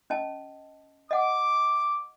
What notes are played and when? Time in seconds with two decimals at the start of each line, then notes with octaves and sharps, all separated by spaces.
0.10 C#4 D#5 A5
1.11 D#5 F#5 D6